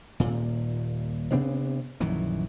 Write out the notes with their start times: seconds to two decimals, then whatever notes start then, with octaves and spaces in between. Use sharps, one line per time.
0.20 D#1 A#2
1.32 C3 B3 C4 D4
2.00 A#1 F#2 D#3 E3